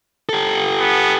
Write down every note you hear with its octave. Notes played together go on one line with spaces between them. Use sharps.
G4 A4
B3